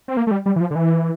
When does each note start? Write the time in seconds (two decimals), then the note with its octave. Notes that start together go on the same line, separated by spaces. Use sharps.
0.08 C4
0.17 A#3
0.27 A3
0.31 G3
0.46 G3
0.56 E3
0.61 F3
0.71 D3
0.75 E3